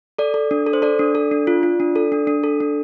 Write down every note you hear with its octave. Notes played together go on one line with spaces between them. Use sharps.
A4 D5
A4
D4
A4
C5
A4 D5
D4
A4
D4
F4
F4
D4
A4
D4
D4
A4
D4